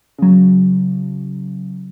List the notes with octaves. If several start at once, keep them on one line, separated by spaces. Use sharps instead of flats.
C#3 F#3